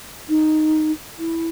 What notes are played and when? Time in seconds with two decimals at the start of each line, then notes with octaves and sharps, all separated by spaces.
0.29 D#4
1.19 E4